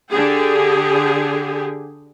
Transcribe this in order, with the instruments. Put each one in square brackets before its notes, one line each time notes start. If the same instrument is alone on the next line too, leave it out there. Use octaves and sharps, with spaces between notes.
[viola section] D3 G4 G#4